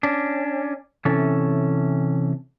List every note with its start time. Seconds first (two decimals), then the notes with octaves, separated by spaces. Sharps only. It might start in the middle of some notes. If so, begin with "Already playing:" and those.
0.03 C#4 D4
1.05 C3 E3 C#4 A4